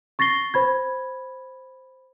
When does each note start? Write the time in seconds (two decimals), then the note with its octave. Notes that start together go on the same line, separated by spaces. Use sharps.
0.19 C#6 A6 A#6 C7 G7
0.54 C5 B5 G#6